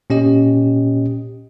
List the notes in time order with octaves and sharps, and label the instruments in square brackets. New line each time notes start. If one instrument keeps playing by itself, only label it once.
[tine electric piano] A#2 C#4 G4 D#5